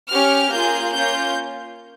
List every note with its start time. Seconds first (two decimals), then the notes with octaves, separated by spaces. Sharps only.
0.10 C#4 G4 F6
0.51 A#3 F4 G#4 G6
0.92 A#3 C#4 F4 G6